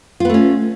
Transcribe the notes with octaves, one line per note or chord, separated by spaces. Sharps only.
A3 B3 C#4 F4